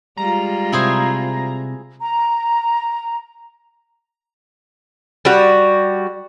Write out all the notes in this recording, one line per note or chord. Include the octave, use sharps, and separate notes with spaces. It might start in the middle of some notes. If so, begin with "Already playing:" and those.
G3 G#3 F4 A#5
C3 E4 G#4 C5
A#5
G3 F#4